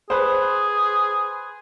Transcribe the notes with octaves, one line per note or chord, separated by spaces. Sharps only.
G#4 B4 C5